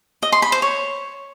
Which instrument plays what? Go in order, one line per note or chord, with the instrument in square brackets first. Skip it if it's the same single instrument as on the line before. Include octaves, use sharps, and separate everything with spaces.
[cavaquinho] D#5
C6
B5
C5
C#5